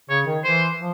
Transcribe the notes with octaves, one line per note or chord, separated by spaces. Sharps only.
C#3 C#5
D#3
E3 C5
F3